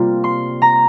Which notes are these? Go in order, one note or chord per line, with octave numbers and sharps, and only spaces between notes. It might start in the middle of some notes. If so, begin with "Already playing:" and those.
Already playing: C3 G3 A#3 F4
C6
A#5